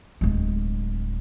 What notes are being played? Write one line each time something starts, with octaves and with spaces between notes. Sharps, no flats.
D1 G#3